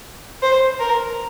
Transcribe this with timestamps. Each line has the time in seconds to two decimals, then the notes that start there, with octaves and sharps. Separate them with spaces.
0.42 C5
0.80 A#4